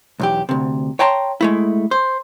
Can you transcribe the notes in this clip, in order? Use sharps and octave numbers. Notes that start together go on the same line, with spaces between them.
B1 E2 G4
D2 C3
C#5 G5 A5 A#5 C6
G#3 A3 E4
C5